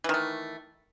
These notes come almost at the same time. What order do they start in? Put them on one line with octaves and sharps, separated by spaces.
E3 D#3 A3